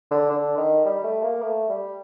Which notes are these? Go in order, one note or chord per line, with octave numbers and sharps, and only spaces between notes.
D3
D3
D#3
G3
A3
A#3
A3
G3